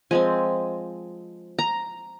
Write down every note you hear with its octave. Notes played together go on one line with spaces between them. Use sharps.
F3 G#3 C4 G#5
A#5